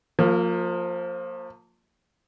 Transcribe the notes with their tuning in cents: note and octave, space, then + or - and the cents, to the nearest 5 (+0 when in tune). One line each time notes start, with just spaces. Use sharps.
F3 +20 A#3 -20